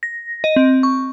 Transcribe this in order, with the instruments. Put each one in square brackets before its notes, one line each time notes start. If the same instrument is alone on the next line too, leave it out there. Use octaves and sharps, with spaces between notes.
[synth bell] A#6
D#5
C4
C#6